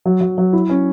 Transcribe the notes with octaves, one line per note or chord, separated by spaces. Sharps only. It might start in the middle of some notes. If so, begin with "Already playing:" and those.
F#3
F#3
F#3
E4
C#4